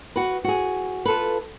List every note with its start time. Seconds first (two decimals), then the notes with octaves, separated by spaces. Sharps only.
0.16 F#4 B4
0.44 F#4 G#4
1.05 F4 A4 B4